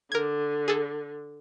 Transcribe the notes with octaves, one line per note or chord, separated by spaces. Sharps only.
D3 A#4 G#6
G#4 A4